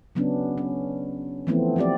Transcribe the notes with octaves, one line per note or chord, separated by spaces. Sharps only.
C#3 F#3 B3 C#4 D4
C#4
E3 F3 A3 B3 C4 E4
F3 F#3 C4 G4 D5